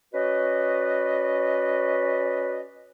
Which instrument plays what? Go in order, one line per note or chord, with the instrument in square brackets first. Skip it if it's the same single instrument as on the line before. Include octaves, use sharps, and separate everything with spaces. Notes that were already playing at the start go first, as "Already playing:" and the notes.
[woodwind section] C#4 F#4 B4 D5 D#5